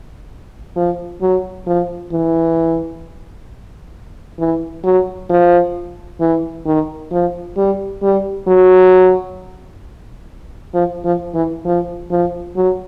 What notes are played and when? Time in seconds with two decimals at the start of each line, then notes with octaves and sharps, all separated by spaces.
0.76 F3
1.22 F#3
1.67 F3
2.12 E3
4.39 E3
4.84 F#3
5.30 F3
6.20 E3
6.66 D#3
7.11 F3
7.57 G3
8.02 G3
8.47 F#3
10.74 F3
11.05 F3
11.34 E3
11.65 F3
12.11 F3
12.56 F#3